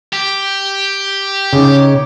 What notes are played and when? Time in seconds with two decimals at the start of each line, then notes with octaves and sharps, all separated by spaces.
0.13 G4
1.53 C#3 D#4 C#5 D6